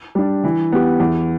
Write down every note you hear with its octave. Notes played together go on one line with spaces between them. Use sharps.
G3 D4
E3
B3 G4
E2